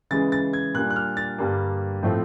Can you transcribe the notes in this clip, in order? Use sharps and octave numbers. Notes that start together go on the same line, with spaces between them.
C#3 E3 G#3 A6
A6
G#6
A#2 G3 A#3 D4 F#6
F#6
F6
A6
G2 D3 G3 A#3
A2 F3 A3 C4